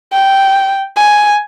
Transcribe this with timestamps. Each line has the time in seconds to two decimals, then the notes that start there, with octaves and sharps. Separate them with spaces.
0.12 G5
0.97 G#5